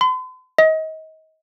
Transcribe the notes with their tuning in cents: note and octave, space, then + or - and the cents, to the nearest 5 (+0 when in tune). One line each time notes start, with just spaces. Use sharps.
C6 -45
D#5 +30